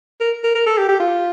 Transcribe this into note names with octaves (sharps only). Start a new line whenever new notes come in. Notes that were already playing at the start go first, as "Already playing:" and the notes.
A#4
A#4
A#4
A4
G4
G4
F4